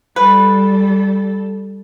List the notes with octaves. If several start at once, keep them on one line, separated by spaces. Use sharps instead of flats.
G3 A4 B4